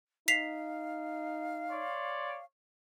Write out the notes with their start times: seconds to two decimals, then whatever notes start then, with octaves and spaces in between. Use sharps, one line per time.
0.28 D#4 F5 B6 C7 F7
1.70 C#5 D5 C6